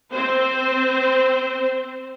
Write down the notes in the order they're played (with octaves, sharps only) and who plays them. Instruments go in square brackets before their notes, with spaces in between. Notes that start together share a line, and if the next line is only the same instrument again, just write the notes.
[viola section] C4 C5